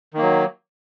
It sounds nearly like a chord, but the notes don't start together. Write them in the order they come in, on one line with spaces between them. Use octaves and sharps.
D#3 A#3 F#3